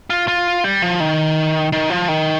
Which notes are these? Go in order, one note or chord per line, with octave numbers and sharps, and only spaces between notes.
F4
F4
G3
F3
D#3
D#3
F3
D#3